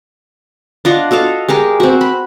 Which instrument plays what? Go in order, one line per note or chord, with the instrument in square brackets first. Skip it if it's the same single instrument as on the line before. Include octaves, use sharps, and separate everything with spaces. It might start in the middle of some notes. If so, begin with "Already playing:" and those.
[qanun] D4 F4 D#5 F#5
F#4 A4 D#5 F5
G#3 G4 A#4
C4 F#4
B5